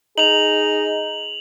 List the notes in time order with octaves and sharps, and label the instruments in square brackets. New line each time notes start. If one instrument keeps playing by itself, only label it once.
[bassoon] D#4 [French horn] G#4 [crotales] F7 F#7